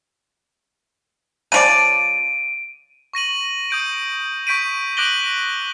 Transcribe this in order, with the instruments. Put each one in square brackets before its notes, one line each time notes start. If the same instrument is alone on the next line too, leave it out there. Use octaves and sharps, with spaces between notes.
[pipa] C#3 F3 D5 [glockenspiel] D7 D#7
[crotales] C#6 A#6 D#7 F#7
D#6 G6 D7
C#6 G6 B6 D7 D#7
D6 F#6 A#6 D7 F#7 G7